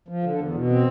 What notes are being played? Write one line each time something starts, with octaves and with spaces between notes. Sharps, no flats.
F3
D3
E2
B2
C4